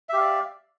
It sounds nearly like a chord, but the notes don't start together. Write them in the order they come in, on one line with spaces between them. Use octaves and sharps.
E5 G4 F5 D5